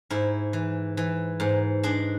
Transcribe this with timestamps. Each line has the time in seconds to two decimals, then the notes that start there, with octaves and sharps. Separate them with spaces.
0.10 G#2 E4
0.53 E3
0.97 E3
1.40 G#2
1.83 G#3 D4